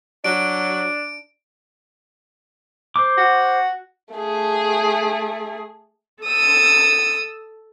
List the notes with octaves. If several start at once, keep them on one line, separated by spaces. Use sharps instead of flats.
F#3 D4 D7
C5 D6
F#4
A3 G#4
A4 D#6 E6